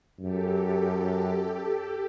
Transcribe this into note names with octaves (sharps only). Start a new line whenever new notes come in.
F#2 G4 A4